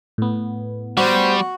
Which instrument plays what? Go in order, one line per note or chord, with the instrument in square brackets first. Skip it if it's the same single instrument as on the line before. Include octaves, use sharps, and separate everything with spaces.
[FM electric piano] A2 B3
[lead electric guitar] G3 [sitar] F#4 [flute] C5